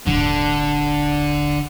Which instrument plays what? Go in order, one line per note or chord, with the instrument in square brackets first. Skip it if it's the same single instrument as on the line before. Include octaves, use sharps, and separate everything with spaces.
[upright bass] D#1 G#1 [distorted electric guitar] D3